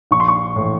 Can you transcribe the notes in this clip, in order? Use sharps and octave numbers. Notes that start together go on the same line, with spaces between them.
A#1 C#6
C6
C#6
A2 E3